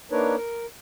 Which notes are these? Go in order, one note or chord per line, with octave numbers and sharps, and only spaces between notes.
A#3 D4 D#4 A#4 B4 C#5
A#4